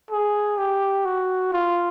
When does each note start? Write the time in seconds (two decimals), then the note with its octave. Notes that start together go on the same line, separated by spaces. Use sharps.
0.11 G#4
0.58 G4
1.05 F#4
1.52 F4